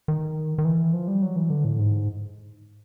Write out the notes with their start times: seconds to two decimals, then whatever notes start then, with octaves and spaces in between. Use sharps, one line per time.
0.08 D#3
0.58 D#3
0.65 E3
0.93 F3
1.08 G3
1.22 F#3
1.36 E3
1.50 D3
1.65 A2
1.79 G#2